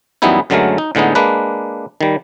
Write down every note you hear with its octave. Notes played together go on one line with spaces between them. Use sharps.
F#2 E3 G3 B3 D#4 E4
F#2 D3 F#3 G#3 A3 A#4
D#4
A2 D3 G#3 B3 D#4
G#3 A#3 D4 B4
D#3 G3